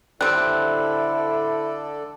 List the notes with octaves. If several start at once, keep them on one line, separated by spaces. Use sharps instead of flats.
D3 G3 C4 E4 A4 D5 F#6